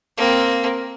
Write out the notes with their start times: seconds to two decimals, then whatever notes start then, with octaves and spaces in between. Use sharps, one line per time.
0.17 A#3 C4